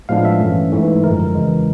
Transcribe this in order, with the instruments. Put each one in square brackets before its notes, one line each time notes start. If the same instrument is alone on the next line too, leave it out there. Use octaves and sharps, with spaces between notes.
[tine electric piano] A2 F3 G#3 B3 D4 F5
E5
G2 E3 A3 C#4
G#2 E3 A3
F#2 D3 F3 G#3 A#4
A#4
E2 C#3 E3 G#3